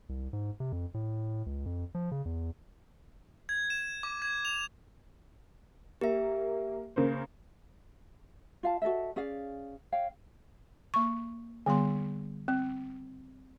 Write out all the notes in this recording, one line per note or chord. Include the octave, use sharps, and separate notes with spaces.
C2
G#2
C3
F2
A2
C#2
F2
F3
C#3
E2
G#6
E7
D6
G#6
F7
A#3 G4 E5
C#3 A#3 C5
F4 F5 A5
F#4 A4 D#5 E5
C#4 G#4 D5 F5
C#5 F5 G5
A#3 C#6
D3 G3 B3 C6
C4